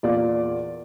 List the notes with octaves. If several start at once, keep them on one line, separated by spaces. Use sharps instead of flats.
E2 A#2 F4 D5